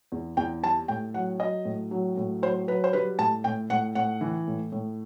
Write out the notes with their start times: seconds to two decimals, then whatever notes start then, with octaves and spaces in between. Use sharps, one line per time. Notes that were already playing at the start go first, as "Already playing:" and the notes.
0.12 E2
0.37 E2 G5
0.63 G3 A5
0.88 A2 G5
1.14 F#3 F#5
1.40 F#3 D#5
1.65 A2
1.91 F#3
2.17 A2
2.42 F#3 C5
2.68 F#3 B4
2.84 C5
2.93 G3 B4
3.18 A2 A5
3.44 A2 G5
3.70 A2 F#5
3.95 A2 F#5
4.21 E3
4.47 A2
4.72 A2